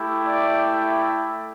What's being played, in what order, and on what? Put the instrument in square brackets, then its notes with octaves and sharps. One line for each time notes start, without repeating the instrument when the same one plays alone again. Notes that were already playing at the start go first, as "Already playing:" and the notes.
Already playing: [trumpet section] A3 E4 G4
D5